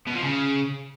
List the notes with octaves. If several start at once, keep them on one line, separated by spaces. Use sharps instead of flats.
B2
F3
C#3